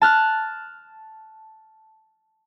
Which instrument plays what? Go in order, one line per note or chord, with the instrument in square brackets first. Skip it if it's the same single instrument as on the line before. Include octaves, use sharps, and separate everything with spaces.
[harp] A5 F6 F#6